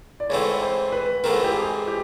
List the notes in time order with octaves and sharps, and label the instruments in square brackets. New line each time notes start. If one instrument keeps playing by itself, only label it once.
[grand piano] D5
[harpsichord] G#2 E3 A3 C4 [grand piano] C#5
[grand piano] C5
B4
[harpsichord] G#2 E3 A3 C4 [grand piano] A#4
[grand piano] G4
G#4
G4